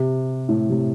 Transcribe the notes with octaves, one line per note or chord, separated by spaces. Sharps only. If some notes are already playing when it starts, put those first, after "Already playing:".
Already playing: C3
A2
C3